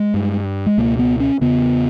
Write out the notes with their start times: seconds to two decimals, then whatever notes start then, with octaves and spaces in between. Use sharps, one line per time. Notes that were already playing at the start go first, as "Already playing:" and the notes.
Already playing: G#3
0.14 G2
0.66 G#3
0.78 C#2 B2 A#3
0.99 B3
1.20 C#4
1.41 E2 C#3 B3